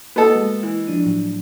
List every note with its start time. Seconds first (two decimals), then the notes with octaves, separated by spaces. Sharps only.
0.16 A#3 B3 F#4 A4 D#5
0.36 G#3
0.63 E3
0.87 F3 D4 D#7
1.04 A2 F#3